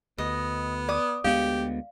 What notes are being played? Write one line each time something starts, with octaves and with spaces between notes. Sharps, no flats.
D2 B3 D#5
D5 D6 D#6
D2 G#3 B3 G4 F5